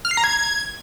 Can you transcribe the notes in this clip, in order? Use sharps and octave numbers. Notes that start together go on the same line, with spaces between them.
F6
C7
A#5
G#6